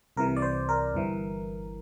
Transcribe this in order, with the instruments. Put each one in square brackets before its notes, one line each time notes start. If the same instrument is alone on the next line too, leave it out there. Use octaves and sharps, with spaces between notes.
[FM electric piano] C2 C3 E3 A#4
D5
C5
A#4
G1 G2 E3